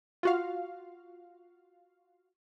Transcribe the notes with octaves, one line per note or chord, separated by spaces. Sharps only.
F4 F#4 F5